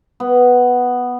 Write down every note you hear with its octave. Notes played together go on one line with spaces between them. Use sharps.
B3